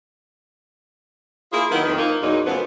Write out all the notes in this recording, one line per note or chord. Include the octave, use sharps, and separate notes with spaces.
A#3 E4 F4 G#4
D#3 F#3 A#3 B3 D#4 E4
F2 D#3
F3 A#3 D#4
E2 A#2 F#3 A#3 D#4
F#2 C#3 F3 A3 B3